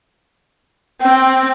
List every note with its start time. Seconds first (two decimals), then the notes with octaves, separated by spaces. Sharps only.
1.01 C4 G5